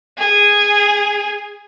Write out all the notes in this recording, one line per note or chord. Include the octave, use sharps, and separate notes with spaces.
G#4